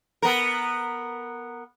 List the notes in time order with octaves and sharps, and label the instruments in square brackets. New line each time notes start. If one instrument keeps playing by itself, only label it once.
[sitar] B3 A#4